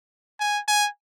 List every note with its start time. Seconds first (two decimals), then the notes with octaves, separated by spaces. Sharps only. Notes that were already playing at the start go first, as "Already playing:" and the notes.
0.40 G#5
0.68 G#5